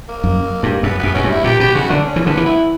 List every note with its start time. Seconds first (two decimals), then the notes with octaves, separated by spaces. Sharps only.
0.09 A#3
0.24 F#2
0.63 G2
0.83 F#2 B3
0.99 F#2 B3
1.14 F#2 C#4
1.24 G2
1.29 E4
1.44 A#2 G4
1.60 B2 G4
1.74 C#3 F#4
1.90 D3 D4
2.05 C#4
2.16 E3
2.25 D3 B3
2.37 E3
2.46 E4